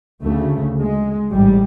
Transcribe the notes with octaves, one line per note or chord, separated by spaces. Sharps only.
D2 C#3 A3
G#3
A1 G#2 G3